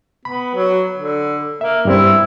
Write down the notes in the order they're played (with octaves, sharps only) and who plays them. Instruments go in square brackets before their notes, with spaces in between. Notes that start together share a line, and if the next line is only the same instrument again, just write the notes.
[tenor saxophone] B3 [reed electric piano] B5
[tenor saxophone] F#3
D3
[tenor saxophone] A#3 [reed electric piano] E5
[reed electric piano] G2 G3 C4 [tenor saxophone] E4